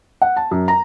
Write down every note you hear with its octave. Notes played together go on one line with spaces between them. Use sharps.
F#5
A5
F#2
A#5